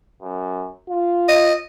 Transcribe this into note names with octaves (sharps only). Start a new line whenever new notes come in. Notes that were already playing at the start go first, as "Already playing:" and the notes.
F#2
F4
D#5